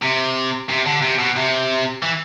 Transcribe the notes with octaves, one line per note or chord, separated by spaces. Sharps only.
C3
C3
D3
C3
B2
C3
E3